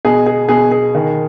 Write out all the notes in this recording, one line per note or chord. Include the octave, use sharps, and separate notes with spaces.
B2 G#4
G#4
B2 G#4
G#4
D#3